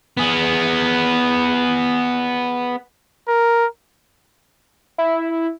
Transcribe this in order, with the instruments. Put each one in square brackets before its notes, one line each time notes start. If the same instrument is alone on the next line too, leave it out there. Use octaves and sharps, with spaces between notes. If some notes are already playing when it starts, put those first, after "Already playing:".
[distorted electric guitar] B3 G#4
[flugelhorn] A#4
[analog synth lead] E4